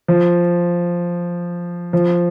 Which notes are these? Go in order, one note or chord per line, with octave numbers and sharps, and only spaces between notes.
F3
F3